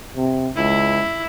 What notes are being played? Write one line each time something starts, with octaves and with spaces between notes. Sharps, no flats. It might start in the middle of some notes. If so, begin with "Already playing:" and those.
C3
C#2 E4